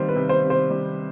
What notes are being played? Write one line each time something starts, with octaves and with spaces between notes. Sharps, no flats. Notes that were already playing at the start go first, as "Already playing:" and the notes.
Already playing: C3 D#3 G3 C5
B4
C3
C5
C3
C5
G3